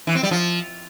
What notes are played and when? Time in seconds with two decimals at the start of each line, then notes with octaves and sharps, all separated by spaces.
0.07 E3
0.15 C4
0.23 G3
0.31 F3